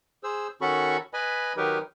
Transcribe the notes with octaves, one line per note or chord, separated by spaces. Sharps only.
G#4 C5 E6
D#3 C#4 F#4 A4 B5 C#6
B4 D#5 G#5 B5
D#3 F#3 D#4 G4 A#4 B4